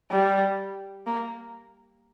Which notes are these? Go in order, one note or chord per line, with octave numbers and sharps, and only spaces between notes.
G3
A#3